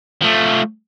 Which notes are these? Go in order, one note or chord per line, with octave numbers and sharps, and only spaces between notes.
F3 A3